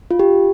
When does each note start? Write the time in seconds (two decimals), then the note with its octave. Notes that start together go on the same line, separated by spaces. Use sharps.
0.11 F4
0.19 G4